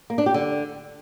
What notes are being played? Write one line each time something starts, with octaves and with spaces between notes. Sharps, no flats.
A#3
D4
G4
D3